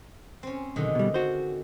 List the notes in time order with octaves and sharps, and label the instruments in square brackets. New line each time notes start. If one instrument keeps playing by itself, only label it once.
[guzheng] C4 C#4
[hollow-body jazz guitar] B1 [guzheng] D3 D#3 G#3
[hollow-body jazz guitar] B2 G3
F#4 C5